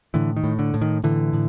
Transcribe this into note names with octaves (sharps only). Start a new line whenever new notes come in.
A2 D3 E3
D#3
A2
D3
A2
D#3
A2 D3 E3
A2